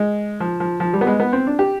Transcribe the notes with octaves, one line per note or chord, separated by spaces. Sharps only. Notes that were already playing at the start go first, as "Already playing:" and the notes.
Already playing: G#3
F3
F3
F3
G3
B3
G#3
B3
C4
D4
G4